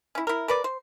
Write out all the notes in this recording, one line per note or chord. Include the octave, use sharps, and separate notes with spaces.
C#4 E4
E4 A#4
A#4 B4 D5
C5